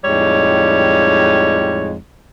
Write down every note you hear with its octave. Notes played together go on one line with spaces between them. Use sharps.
F2 A2 G3 G#3 D#4 C#5